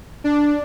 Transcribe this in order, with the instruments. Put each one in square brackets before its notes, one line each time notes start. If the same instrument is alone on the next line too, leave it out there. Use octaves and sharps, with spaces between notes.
[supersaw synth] D4